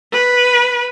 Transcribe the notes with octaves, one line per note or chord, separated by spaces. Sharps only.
B4